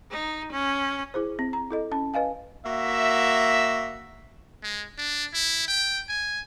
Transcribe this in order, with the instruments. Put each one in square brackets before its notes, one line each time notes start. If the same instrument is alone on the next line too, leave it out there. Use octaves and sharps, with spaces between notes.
[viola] D#4
C#4
[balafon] E4 G#4 C5
C4
A#5
E4 A4 D#5
C#4 A5
B4 D#5 F5 G#5
[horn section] A#3 F#4 E5
[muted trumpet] G#3
D4
E4
G5
G#5